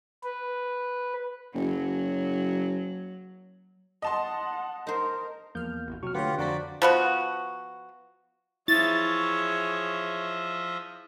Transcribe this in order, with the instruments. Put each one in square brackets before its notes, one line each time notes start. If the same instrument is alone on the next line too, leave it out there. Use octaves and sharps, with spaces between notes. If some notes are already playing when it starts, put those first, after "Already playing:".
[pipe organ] B4
[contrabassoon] F#1 [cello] F#3
[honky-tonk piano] D#5 A5 C6 [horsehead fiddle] F#5
[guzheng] D#4 C5 [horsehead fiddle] A#4
[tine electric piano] E2 A#3 G6 [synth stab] F3 F6
[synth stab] A1 B2
[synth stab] C3 [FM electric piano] F#3 [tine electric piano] C#6 F6
[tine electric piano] D3 [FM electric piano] A3 C#5 [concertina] F4 G4 F#5 [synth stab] B4
[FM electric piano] F2 A#5 B6 [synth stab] D4 A4 C5 [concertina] F#4 D5
[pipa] F3 B3 F#4
[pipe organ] F3 D#5 E5 [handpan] E4 [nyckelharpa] G#4 C#5 [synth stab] A6